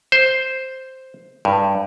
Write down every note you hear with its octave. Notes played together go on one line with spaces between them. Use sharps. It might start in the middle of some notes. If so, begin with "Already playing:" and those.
C5
G2